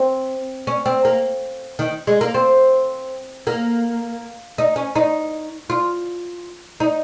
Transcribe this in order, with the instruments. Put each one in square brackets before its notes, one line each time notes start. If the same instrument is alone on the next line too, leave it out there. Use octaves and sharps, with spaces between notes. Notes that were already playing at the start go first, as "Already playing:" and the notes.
Already playing: [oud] C4
C#4
C4
A#3
D#3
G#3
A#3
C4
A#3
D#4
C#4
D#4
F4
D#4